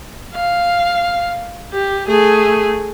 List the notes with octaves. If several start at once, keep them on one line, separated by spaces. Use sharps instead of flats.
F5
G4
A3 G#4